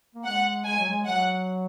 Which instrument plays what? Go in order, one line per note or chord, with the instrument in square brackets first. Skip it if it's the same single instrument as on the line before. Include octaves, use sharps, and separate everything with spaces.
[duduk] A#3
[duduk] G#3 [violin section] F#5
[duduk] G#3 [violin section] G#5
[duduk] F#3
G#3
[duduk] F#3 [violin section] F#5